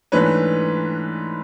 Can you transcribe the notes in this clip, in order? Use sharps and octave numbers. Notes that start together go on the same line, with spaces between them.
G#2 E3 A3 D4 B4 C#5